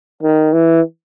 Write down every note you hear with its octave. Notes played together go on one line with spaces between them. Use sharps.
D#3
E3